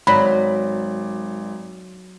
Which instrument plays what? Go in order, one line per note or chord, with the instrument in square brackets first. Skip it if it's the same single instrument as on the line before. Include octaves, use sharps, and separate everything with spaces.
[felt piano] G#1 D5 [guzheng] F#3 [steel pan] B5